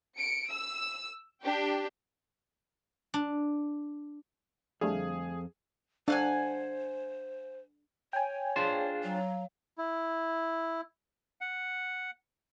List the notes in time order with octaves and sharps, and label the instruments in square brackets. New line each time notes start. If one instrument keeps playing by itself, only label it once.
[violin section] C#7 D7
E6
D4 G4 G5
[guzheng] D4
[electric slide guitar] F2 F5 [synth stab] D3 G3 A3 [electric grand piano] G#4
[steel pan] D4 [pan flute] C5 [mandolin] F5 F#5 G#5
[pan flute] C#5 [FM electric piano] G5 G#5
[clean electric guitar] D4 F4 C5 [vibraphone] G#4 F5
[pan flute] F#3 [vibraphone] C#5 F5
[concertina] E4
F#5